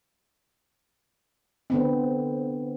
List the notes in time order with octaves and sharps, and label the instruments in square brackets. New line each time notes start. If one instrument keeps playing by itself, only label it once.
[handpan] D3 B3 C4